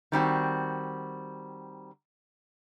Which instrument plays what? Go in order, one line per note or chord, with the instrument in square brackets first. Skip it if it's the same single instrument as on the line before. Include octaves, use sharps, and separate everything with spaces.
[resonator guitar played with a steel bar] D#3 G3 C4 F#4